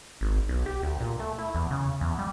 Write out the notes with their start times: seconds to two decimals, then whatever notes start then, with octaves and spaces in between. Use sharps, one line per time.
0.21 G#1
0.49 B1
0.66 G4
0.83 D2
1.00 A#2
1.20 A3
1.39 E4
1.55 E2
1.70 C#3
2.01 E2
2.19 G3